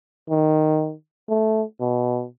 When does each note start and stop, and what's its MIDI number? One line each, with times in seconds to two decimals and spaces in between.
0.30 0.94 51
1.29 1.63 57
1.80 2.26 47